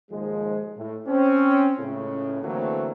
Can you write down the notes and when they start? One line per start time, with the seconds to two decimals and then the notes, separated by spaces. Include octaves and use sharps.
0.11 D#2 G#2 F3 G#3
0.77 A2
1.07 C4 C#4
1.79 C#2 A2 C#3
2.44 D3 E3 F#3 A3 A#3 C4